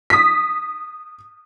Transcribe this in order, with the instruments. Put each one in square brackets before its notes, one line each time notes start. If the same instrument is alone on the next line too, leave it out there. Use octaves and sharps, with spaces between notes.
[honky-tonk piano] D#6 B6